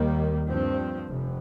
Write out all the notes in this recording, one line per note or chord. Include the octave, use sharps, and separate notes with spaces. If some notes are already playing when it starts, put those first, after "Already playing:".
Already playing: D#2 D#3 G3 A#3
G2 F3 C4
F1